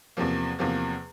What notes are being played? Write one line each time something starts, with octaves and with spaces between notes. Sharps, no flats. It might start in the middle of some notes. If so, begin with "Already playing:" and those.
E2 C3 F3 A#3
E2 C3 F3 A#3